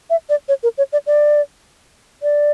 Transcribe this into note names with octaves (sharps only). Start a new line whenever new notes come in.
E5
D5
C#5
A#4
C#5
D5
D5
D5